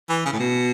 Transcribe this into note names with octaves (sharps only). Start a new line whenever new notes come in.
E3
C#3
A2
B2